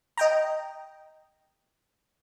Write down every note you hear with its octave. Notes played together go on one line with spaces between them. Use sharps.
D#5 G5 A#5